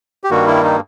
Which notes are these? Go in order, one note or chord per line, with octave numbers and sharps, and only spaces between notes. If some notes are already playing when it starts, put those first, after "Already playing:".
G4
G2 D#3 G3 A#3 F#4
E4
D#4